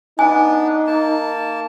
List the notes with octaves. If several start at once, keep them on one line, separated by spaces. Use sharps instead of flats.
B3 D4 D#4 B4 G#5
A#3 A5